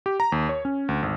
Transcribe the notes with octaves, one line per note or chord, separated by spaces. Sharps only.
G4
A#5
D#2
C#5
C#4
D2
G#1